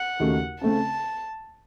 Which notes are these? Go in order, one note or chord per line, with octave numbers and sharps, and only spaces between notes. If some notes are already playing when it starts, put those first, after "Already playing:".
Already playing: F#5
D#2 C#3 A3 D#4 F#4
C#3 A3 C4 A5